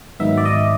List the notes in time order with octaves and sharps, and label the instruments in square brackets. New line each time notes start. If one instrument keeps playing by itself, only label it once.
[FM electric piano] G#2 D#3 F#3 B3 D#4 E5
D5
D#5